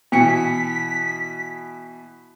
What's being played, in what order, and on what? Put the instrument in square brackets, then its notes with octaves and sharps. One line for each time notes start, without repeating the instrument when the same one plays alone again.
[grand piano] B2 E3 C#7 [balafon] B3 [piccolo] B6